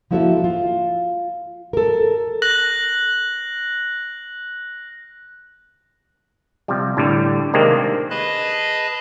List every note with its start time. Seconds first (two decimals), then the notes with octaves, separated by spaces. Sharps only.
0.11 F3 A#3 E4 F#4 A4 E5
0.44 F4
1.73 A4 A#4
2.42 F#6 A#6 F#7
6.68 C3 F3 G3
6.97 A2 D3 G3
7.53 C3 D#3 G#3 A#3 C4 D4
8.10 G#4 B4 D#5 A5 B5 F#6